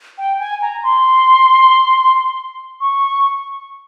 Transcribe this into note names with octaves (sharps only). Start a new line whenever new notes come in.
G5
G#5
A#5
C6
C#6